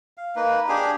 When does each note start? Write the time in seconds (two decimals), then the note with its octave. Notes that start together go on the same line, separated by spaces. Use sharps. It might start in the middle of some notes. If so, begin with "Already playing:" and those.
0.18 F5
0.36 A#3 D#4 B4
0.68 D4 G4 G#4